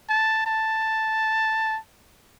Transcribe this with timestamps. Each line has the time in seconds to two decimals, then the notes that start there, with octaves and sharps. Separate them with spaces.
0.09 A5
0.46 A5